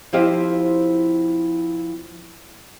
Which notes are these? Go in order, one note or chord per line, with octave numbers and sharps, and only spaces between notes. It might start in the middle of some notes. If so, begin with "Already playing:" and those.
F3 C4 E4 G4 D#5 F5